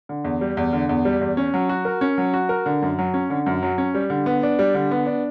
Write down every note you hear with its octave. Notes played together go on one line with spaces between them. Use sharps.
D3
E2
G3
E2
D3
E2
G3
E2
C#4
F#3
F#4
A#4
C#4
F#3
F#4
A#4
D3
F#2
F#3
C#4
D3
F#2
F#3
C#4
G3
D3
B3
D4
G3
D3
B3
D4